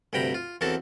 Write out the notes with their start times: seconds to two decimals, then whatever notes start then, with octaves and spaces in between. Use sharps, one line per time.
0.13 D2 G2 C3 G5 A#5 B5
0.34 F4
0.61 E2 A#3 C4 F#4 A4 A5